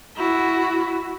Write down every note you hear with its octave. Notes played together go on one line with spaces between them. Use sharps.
E4 F#4